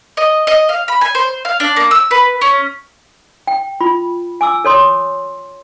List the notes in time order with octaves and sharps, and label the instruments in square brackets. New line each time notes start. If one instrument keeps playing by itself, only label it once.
[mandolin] D#5
D#5
F5
B5
G#5
C5
F5
D4
A#3
E6
B4
C#4
[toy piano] G5
F4 B5
G#5 D6 E6
A4 C#5 C6 D6